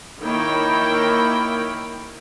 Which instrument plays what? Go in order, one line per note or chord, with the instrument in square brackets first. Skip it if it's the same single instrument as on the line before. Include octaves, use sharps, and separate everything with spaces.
[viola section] D#3 A#3 E4 C#5 G5 B5